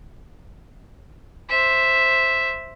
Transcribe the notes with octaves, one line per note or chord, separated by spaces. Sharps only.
C5 E5